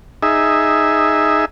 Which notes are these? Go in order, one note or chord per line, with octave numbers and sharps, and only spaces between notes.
D#4 G#4 E5